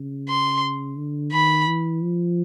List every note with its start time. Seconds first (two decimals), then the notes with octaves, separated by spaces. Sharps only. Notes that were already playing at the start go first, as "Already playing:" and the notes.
Already playing: C#3
0.29 C6
0.97 D3
1.32 D#3 B5
1.67 E3
2.02 F3